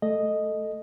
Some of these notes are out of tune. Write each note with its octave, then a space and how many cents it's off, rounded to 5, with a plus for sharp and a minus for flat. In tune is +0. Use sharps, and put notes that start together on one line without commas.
A3 +0 A4 +0 D#5 +0